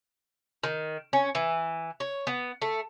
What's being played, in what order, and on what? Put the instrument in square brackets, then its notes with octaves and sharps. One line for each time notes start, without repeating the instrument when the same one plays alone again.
[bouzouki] D#3
C#4
E3
C#5
B3
A3